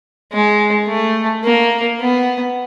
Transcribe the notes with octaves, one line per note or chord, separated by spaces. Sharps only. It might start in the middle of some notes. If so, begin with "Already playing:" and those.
G#3
A3
A#3
B3